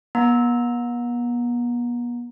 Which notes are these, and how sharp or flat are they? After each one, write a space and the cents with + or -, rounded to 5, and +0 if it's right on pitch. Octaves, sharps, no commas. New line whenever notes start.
B3 -40 A#5 +0